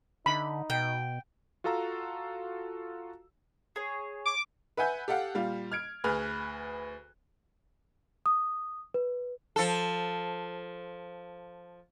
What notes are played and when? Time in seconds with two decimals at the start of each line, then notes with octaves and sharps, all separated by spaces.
0.26 D3 D#4 B5
0.70 B2 G5
1.64 F4 F#4 A4 F5 A#5 E6
3.76 G#4 C#5
4.26 D6
4.77 B4 E5 F#5 G#5 G6
5.08 G4 A4 F5 F#5
5.34 A#2 G3 F4
5.72 F6 G#6 D7
6.04 D2 G#4 B4 F6 F#6
8.26 D#6
8.94 B4
9.56 F3 A4